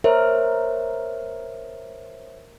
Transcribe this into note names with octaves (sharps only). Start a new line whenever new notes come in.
A#4 C5 C#5 E5